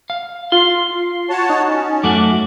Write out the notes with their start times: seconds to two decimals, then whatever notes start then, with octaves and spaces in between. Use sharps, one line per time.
0.10 F5
0.52 F4 C6 C7
1.30 F#4 C#5 A5
1.50 D#4
1.68 C#4
2.03 F#2 A3 F#4 D6